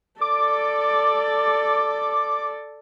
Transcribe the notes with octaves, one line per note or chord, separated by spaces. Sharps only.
A4 D5 D6